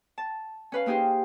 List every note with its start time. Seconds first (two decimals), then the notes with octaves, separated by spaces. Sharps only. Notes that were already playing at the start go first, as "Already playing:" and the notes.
0.18 A5
0.72 C#4 B4 F5
0.86 A#3 D#4 G4 G#4 C5